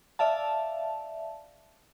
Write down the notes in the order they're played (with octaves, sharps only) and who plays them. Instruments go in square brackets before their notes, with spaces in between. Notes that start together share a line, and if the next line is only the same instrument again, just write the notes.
[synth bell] D5 E5 F5 A5